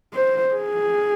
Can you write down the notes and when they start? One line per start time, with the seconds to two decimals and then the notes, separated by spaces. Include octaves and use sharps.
0.14 C5
0.54 G#4